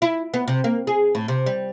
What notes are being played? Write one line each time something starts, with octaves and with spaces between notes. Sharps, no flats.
E4
B3
C3
A#3
G#4
A2
C3
G3